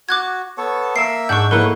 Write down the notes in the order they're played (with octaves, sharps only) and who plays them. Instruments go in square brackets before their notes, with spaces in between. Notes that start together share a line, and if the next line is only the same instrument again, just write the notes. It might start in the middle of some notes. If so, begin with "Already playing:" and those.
[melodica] F#4 [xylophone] D6 F#6 G#6
[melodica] B3 A4 C#5
[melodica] A#3 E5 [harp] E6 D7 [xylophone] C7
[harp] G#2 F#5 D7 [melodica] D4 E6 [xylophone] C#6 G6
[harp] A3 A#3 E4 [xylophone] A#4 [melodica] B4 C#5 F#5